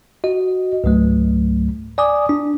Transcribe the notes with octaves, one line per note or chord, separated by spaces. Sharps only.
F#4 D#5
C#2 G#2 F#3 A3
D5 G#5 D6 D#6
D4